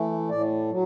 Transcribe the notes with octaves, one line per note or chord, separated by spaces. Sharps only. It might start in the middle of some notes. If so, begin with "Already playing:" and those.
Already playing: E3 A3
A2 D5
F#3